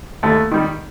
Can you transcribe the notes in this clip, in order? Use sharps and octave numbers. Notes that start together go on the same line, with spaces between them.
D#2 A3
D#3 G3